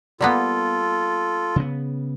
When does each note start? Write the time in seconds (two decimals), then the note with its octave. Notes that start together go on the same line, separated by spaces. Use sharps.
0.21 G3 A#3 B3 F4 A4
1.56 C#3 B3